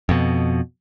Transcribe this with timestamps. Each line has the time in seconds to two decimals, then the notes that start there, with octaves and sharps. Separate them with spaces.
0.09 F2 B2